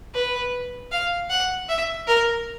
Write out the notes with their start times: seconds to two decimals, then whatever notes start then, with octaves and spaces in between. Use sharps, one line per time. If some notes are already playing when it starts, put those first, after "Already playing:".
0.14 B4
0.91 F5
1.30 F#5
1.69 E5
2.07 A#4